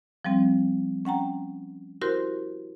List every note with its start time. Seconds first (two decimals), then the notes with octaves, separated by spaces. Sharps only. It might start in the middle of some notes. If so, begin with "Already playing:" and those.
0.25 F3 G3 C4
1.05 C#4 F#5 G5 A#5
2.01 E4 F#4 G4 A#4 C5 C6